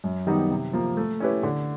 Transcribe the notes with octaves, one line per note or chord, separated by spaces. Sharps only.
F#2
D#3 G3 B3 D#4
C3
F3 A#3
A3
C#4 E4 G4 B4
D3